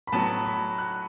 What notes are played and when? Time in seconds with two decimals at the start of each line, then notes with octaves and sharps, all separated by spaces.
0.07 B5
0.12 A2 F#3 B3 A5
0.46 B5
0.78 F#6